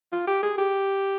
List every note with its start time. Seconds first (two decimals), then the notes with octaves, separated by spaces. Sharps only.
0.12 F4
0.27 G4
0.43 G#4
0.58 G4